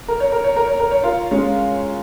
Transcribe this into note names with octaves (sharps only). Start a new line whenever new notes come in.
A#4
C#5
A#4
C#5
A#4
C#5
A#4
C#5
F4 A#4
G#3 C#4